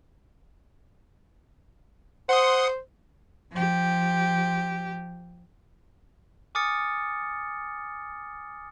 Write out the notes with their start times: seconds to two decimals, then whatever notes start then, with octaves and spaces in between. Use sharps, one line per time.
2.29 C5 F#5 C6 D#6
3.52 F3 G4
6.55 G#5 D6 D#6 F6 A6 C#7